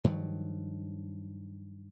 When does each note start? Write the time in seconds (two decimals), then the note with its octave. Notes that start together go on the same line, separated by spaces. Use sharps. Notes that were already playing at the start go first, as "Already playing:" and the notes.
0.04 G2 D#3 F3 F#3